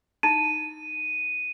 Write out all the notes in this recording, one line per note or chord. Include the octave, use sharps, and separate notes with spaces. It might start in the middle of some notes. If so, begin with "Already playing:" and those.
D#4 E4 D#7